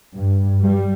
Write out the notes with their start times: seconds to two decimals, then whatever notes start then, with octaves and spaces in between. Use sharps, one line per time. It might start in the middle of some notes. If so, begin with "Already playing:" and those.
0.14 G2
0.61 G3